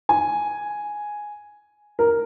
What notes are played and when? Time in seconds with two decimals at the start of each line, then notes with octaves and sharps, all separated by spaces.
0.09 G#5
1.99 A#4